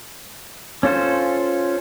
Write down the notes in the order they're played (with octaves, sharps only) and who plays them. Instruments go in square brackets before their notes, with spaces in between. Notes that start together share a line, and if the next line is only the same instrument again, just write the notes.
[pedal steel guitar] C#4 F4 A4 C5